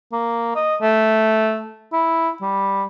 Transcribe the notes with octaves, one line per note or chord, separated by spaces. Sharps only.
A#3
D#5
A3
E4
G3